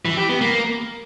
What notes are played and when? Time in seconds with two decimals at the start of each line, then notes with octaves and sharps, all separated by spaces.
0.05 E3
0.17 G4
0.29 B3
0.41 A#3